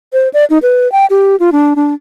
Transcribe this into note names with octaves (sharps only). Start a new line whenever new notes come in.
C5
D5
D#4
B4
G5
G4
F4
D4
D4